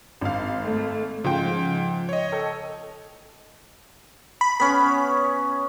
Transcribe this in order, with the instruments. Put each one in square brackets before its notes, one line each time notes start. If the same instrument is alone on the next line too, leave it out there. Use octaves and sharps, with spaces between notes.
[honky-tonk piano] G#1 F5
[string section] A3
[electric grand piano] G#2 G5 [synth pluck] C#3 F3 F4
[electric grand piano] C#5 D#5
[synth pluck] A4 G5
[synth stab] B5
[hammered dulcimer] B3 C#4 [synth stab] B5